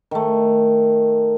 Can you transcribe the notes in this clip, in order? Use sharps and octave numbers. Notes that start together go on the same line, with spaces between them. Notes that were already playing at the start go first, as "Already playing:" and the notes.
D#3 A3